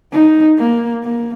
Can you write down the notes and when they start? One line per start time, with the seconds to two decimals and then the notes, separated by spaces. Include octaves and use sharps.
0.12 D#4
0.58 A#3
1.03 A#3